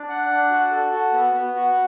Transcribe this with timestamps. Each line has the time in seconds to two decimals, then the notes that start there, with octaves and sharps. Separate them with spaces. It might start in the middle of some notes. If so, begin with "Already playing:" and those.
Already playing: D4
0.09 F#5
0.30 D4
0.51 F#4
0.71 A4
0.92 F#4
1.13 B3
1.34 B3
1.56 F#4